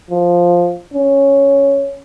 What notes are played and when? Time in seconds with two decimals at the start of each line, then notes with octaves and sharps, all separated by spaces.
0.11 F3
0.94 C#4